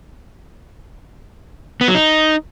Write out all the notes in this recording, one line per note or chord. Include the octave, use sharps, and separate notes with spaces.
B3
F#3
D#4